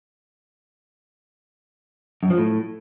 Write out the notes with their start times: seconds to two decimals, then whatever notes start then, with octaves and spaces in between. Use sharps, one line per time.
2.23 F#2
2.30 F3
2.38 A2